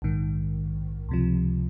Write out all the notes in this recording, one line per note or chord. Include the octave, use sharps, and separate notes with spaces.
A#1 G#2 D#3
C#2 C3 F3